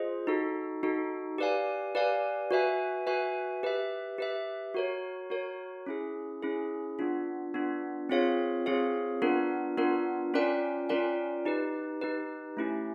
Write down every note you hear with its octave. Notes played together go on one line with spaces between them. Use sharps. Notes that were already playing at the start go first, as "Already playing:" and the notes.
Already playing: F4 G#4 C5 D#5
D#4 F#4 A4
D#4 F#4 A4
G4 B4 D5 F5 G#5
G4 B4 D5 F5 G#5
F#4 B4 E5 G#5
F#4 B4 E5 G#5
G4 B4 E5
G4 B4 E5
F#4 A#4 C#5
F#4 A#4 C#5
C#4 E4 G#4
C#4 E4 G#4
B3 D4 F4
B3 D4 F4
C4 F4 G#4 C#5 F5
C4 F4 G#4 C#5 F5
B3 D4 F4 A#4
B3 D4 F4 A#4
C#4 F4 A#4 D5 G5
C#4 F4 A#4 D5 G5
D#4 G4 B4
D#4 G4 B4
A3 C#4 E4 G4